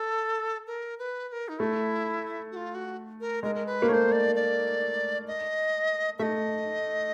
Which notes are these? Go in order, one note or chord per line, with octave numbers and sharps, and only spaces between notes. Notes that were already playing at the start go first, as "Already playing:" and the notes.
Already playing: A4
A#4
B4
B4
A#4
D#4
A3 E4
F#4
F4
F#4
A#4
G#3 A#4
A#4
B4
A#3
A3 C5 C#5
D5
D5
D#5
A3 D#5 E5